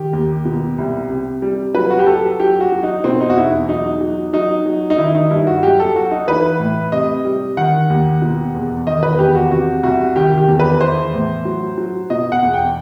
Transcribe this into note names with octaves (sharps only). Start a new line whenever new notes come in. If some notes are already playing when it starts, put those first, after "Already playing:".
Already playing: D#3 G4
D#2
B2
C2
C3
G3
F#3 B4
F#4
G4
F#3 A4
F#3 G4
F#4
F#3
D#4
B2 C4
D#4
F#4
E2 E4
F#3 D#4
F#3
F#3 D#4
F#3
D#4
D#3 E4
D#4
G2 E4
F#4
F#3 G4
A4
F#3 F#4
D#4
E3 B4
A2
C3 D#5
G3
D#3 F#5
D#2
B2
E2
D#3 D#5
B4
E2 G4
F#4
C3 F#4
C2 F#4
D#3 G4
G4
E2
B4
E3 C5
A2
F#3
F#3
B2 D#5
F#5
E2
G5